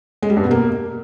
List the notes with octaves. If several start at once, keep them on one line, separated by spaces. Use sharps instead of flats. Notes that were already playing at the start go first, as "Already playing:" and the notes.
G#3
G3
G2
B2
A#3